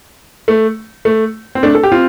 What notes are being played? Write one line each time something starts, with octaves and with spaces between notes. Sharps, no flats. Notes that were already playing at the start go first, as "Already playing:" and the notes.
A3
A3
C4
A3 D4
A4
G4
C4 F4